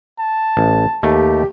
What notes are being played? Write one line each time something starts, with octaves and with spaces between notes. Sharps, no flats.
A5
A1
D#2 A3 G4